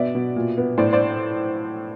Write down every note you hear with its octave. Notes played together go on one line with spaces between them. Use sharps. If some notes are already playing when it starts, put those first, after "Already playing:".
Already playing: B2 B3 D5 E5
B2
A#2
B3
A2 C5 D5
C5 D5